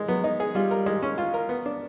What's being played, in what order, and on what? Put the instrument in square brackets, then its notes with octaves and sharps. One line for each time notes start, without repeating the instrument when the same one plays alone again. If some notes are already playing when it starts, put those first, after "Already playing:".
Already playing: [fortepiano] G#3
[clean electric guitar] F#3 [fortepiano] B3
[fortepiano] D#4
G#4
[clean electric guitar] G3 [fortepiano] F4
[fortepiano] A#4
G#3
C#4
F4
A#4
B3
D4